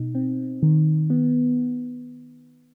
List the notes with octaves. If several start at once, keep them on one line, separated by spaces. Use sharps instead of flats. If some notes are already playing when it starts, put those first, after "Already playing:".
Already playing: B2 D#4
C4
D#3
B3